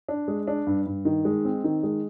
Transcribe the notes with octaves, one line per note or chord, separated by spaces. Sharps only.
D4
G#3
D4
G2
G2
D#3
G#3
C4
D#3
G#3